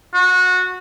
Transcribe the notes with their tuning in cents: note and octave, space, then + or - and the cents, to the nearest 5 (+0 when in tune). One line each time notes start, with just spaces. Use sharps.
F#4 -20